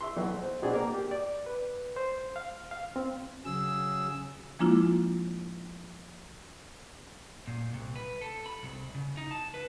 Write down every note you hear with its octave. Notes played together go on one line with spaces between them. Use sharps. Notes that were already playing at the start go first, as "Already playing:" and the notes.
E5 C6
B1
C5
B2 C4 D4 G#4
A#3 A#4
G4
D5
B4
C5
F5
F5
C4
C#3 F#3 G#4 E6
F3 G#3 A#3 D4 E4 F4
A#2
C2
B4
A4
B5
C2
C#3
D#4
A5
B4